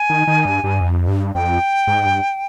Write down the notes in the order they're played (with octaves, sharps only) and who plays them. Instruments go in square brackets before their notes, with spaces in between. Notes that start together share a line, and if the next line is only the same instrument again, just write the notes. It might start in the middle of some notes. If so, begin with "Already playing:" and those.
Already playing: [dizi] G#5
[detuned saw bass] D#3
D#3
G2
G2
F2
G2
[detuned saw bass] F2 [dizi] G5
[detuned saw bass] G#2
G2